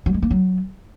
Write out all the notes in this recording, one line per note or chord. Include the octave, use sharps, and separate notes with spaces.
F#3
G#3
A#3
F#3